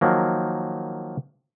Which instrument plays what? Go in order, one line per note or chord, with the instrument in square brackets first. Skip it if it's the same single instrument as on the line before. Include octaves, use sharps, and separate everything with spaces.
[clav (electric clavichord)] D#3 F3 F#3 A#3